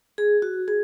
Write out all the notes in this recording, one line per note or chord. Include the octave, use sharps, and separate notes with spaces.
G#4
F#4
G#4